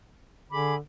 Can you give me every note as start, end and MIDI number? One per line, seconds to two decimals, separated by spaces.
0.52 0.77 50
0.52 0.74 68
0.52 0.74 83
0.52 0.74 86